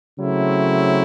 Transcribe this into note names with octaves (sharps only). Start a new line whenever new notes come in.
C#3 F#3 A3 C4 E4